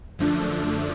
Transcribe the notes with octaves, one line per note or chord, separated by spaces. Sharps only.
F#2 D3 F3 A3 D4